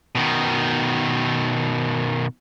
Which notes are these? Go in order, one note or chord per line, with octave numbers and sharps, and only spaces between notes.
B2 D#3